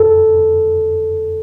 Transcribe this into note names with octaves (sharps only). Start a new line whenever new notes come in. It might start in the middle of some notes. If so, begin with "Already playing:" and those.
Already playing: A4